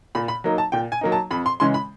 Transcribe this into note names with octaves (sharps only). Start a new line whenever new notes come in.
A#2 B5
B5
F#3 A#3 D#4
A5
A#2 G5
G#5
F#3 A#3 D#4
A5
F2 B5
C6
C#3 E3 G#3 C#4 C6
B5